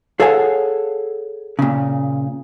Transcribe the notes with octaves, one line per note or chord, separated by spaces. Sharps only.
G#4 A4 C#5 F5 F#5 G#5
A#2 C#3